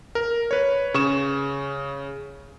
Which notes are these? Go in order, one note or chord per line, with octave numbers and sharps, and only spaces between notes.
A#4
B4 C#5
C#3 C#6 E7